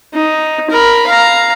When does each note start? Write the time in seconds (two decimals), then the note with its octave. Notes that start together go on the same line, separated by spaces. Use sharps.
0.14 D#4
0.70 A#4 B5
1.07 F5 A#5